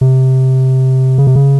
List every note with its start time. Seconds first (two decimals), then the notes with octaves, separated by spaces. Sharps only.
0.01 C3
1.18 C#3
1.27 C3
1.36 C#3